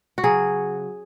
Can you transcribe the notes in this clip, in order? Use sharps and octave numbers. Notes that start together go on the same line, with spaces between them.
F#4
C#3 F#3 G#4